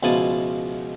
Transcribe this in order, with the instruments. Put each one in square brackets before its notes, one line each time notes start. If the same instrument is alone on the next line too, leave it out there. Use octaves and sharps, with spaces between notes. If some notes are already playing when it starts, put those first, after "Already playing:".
[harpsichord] C#2 B2 F3 E4 A5 D#6